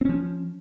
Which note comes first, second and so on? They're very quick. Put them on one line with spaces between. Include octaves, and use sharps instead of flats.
C4 C#4 F3